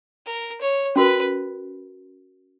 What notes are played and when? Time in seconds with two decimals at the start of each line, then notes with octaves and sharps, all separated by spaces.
0.26 A#4
0.61 C#5
0.96 C#4 F#4 A#4 B4